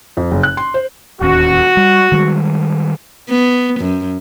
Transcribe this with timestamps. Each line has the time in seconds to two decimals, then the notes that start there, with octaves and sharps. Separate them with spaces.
0.17 F2
0.31 F#1
0.43 F#6
0.57 C6
0.74 C5
1.21 D1 D#2 C#4 F#4
1.77 G3
2.12 D#3 G3 G#3
3.29 B3
3.81 F#2